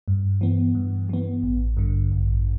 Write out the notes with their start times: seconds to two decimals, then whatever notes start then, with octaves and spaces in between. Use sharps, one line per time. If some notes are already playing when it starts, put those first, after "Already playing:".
0.08 G2
0.41 E3 B3
0.75 G2
1.09 E3 B3
1.43 A1
1.77 G2 D3
2.12 A1